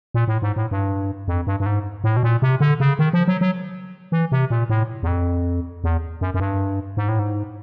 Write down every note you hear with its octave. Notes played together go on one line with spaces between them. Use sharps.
A#2
A2
G#2
A2
G2
F2
G2
G2
G#2
A2
B2
A#2
C3
D3
C#3
D#3
F3
F#3
F#3
E3
C3
A#2
A2
E2
F2
E2
F#2
F#2
G2
G#2
A2
G#2